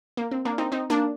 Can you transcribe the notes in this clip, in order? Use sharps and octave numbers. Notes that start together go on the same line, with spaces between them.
A#3
C4
A#3 D4
C4 D#4
C4 D#4
A#3 D4